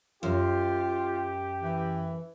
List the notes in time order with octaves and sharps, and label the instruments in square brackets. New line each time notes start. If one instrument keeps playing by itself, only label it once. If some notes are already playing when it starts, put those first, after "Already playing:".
[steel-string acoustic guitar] F#2 [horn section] F4 [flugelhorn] G4
[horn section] E3